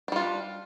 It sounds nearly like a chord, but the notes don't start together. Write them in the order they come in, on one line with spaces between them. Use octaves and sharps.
D4 G3 F4